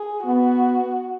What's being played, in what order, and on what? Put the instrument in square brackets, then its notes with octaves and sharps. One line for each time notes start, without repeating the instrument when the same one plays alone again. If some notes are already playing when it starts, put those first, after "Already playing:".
Already playing: [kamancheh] G#4
[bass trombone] B3 [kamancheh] F#4